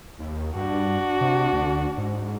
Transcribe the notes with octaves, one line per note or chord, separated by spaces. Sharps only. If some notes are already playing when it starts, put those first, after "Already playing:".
D#2
G2 D4 F#4
C3
D2
G#2